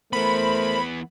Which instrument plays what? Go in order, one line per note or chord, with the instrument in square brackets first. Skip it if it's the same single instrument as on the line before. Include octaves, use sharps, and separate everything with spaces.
[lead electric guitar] E3 B3 [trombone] A3 [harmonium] A#4 C5 [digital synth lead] B5